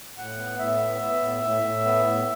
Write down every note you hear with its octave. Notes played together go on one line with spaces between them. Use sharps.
A2 F#5
B3
A2 E5
B3
B3
A2
A2
A2
B3
A2